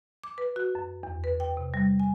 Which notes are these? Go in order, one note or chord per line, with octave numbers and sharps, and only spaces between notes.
D6
B4
F#4
F#2
E2
B4
G5
C3
G3
G#5